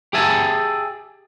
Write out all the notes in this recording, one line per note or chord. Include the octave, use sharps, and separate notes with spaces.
G4 G#4 E5 G#5 A5